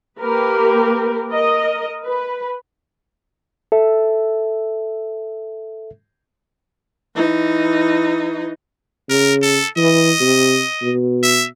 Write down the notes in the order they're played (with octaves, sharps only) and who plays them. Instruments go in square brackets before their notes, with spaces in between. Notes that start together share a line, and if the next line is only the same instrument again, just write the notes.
[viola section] A#3 G4 A#4 B4
A#4 D#5
B4
[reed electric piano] A4 E5
[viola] E3 D#4
[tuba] C#3 [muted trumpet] A#4
[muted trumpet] A4
[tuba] E3 [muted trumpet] D#5
[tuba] C3
B2
[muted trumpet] E5